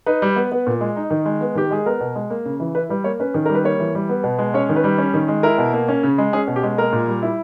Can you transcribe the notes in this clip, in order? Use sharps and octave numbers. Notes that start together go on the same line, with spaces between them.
D#4 B4
G3
B3
B3
A#2
G#3
D#4
D#3
G#3
B3
D#3 G4
G#3 G#4
B3 A#4
B2
G#3
A#3
C#3
E3
E4 B4
G3 B4
A#3 C#5
C#4 B4
D#3
G3 A#4
B4
A#3 C#5
E3
G3
B3
B2
G#3
C#4 C#5
D#3
B4
G3
C#4
D#3
G#3
E4 A#4
B2
A#3
C#4
C#3
G#3
C#4 G#4
B2
G4
G#3
A#3 A#4
A#2
G3
E4